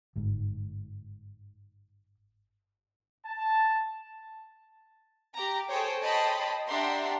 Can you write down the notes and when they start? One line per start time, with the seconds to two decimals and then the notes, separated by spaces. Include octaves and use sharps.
0.16 G1 G#2
3.25 A5
5.32 G4 A#5
5.69 G#4 A4 C5 C#5 G5
6.01 C#5 D#5 G5 A5 B5 C6
6.67 D4 G4 E5 F#5 A#5 C6